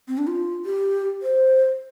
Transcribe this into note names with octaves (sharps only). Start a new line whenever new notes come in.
C4
D4
F4
G4
C5